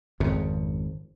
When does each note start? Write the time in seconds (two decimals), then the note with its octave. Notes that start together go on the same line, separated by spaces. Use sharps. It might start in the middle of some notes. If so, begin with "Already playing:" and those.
0.20 G#1 F2 C#3